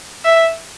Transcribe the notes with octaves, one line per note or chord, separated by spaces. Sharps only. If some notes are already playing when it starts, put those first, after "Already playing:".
E5